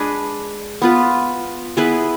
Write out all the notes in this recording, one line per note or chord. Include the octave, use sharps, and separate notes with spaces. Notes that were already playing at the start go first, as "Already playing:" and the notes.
Already playing: G#3 D4 G#4 B4
B3 F4 B4
B3 E4 G#4 B4